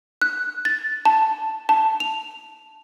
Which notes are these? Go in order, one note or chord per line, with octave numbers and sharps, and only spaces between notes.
F#6
A6
A5
A5
F7